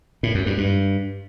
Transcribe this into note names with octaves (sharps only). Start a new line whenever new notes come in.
A2
F#2
G2
G2